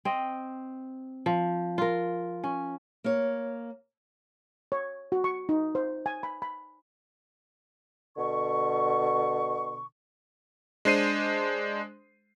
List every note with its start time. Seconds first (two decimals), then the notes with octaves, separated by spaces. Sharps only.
0.05 C4 D#5
1.26 F3
1.78 F4 A#4
2.44 C#4
3.04 A#3 C#5
4.72 C#5
5.12 F#4
5.24 C#6
5.49 D#4
5.75 C5
6.06 G#5
6.23 B5
6.42 B5
8.17 B2 D3 C#6
10.85 G#3 D4 C5 C7 D#7